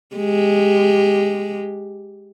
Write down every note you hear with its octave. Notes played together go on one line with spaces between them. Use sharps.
G#3 G4